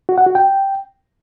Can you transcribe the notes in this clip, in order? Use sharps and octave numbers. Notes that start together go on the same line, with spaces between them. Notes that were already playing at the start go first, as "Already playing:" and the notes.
F#4
F#5
F#4
G5